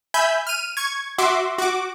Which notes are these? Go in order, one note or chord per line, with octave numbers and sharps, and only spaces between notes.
E5 G#5 B5 G6
F6 D#7
C#6 G#6
F#4 E5 C6 D6
F#4 D6